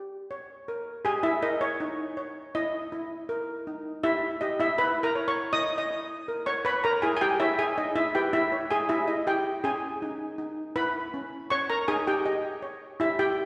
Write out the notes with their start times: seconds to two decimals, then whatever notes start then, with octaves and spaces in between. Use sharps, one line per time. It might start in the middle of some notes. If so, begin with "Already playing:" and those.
Already playing: G4
0.31 C#5
0.68 A#4
1.05 G4 G#4 G#5
1.23 E4 E5
1.42 A#4 D#5
1.61 C#5
1.80 D#4
2.17 C#5
2.55 E4 D#5
2.92 E4
3.29 A#4
3.67 D#4
4.03 E4 G4 E5
4.41 G4 D#5
4.60 E4 E5
4.78 E4 B4 B5
5.03 A#4 A#5
5.15 C#5
5.28 C#5 C#6
5.53 E4 D#5 D#6
5.78 D#5 D#6
5.91 E4
6.28 A#4
6.46 C#5 C#6
6.65 B4 C#5 B5
6.84 A#4 A#5
7.02 E4 G#4 G#5
7.17 G#5
7.21 G4 G5
7.40 E4 C#5 E5
7.59 G#4 G#5
7.78 D#4 D#5
7.96 E4 E5
8.15 G4 B4 G5
8.33 E4 E5
8.52 C#5
8.71 G#4 G#5
8.89 E4 G4 E5
9.08 D#5
9.27 E4 G4 G5
9.64 C#4 G#4 G#5
10.02 D#4
10.38 D#4
10.76 E4 B4 B5
11.14 C#4
11.50 C#5 C#6
11.70 A#4 A#5
11.88 D#4 G#4 G#5
12.07 G4 G5
12.26 G4 D#5
12.62 C#5
13.00 E4 G4 E5
13.19 G4 G5